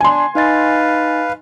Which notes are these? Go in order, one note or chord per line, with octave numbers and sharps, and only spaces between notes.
D4 G#5 C6
D#4 B4 D#5 F5 A6